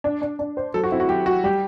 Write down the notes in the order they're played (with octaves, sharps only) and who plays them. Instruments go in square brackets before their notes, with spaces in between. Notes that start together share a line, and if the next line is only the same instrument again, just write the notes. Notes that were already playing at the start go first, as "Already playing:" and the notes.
[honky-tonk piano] D4
D4
D4
C5
[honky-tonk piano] F#3 [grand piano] A4
[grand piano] F#4
[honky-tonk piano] C4 [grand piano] E4
[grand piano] F#4
[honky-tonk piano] F#3 [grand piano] G4
[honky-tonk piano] F#3 [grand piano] F#4
[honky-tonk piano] G3 [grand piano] G4